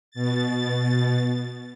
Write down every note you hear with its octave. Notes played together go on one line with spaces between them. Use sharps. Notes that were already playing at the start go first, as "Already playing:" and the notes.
B2 A6